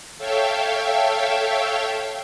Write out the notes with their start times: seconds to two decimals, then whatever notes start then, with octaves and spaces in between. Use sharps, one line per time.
0.18 A4 C#5 E5 F5 G5